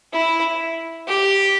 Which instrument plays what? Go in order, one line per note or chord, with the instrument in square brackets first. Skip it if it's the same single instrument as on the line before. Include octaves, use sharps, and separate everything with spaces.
[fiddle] E4
G4